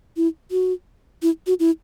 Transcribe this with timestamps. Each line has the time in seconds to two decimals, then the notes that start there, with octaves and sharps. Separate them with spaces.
0.17 E4
0.51 F#4
1.22 E4
1.47 F#4
1.60 E4